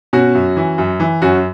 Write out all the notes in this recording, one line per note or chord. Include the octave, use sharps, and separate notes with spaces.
B2 C#4 F#4
F#2
E3
F#2
E3
F#2 C#4 F#4